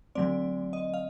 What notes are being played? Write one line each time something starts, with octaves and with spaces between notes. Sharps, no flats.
D3 F#3 A3 C4 D5
D#5
F5